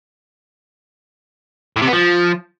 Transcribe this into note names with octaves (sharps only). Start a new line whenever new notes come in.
A2
C3
B3
F3